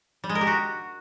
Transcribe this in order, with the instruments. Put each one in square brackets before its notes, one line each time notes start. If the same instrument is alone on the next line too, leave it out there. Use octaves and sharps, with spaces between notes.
[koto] G3
G#3
A#4
G4
F#4